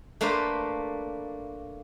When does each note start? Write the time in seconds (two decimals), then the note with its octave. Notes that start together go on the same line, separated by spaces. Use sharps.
0.21 A3 A#3 D4 B4 C5 F5